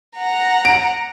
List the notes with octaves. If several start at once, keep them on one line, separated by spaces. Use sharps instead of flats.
F#5 A#5
D7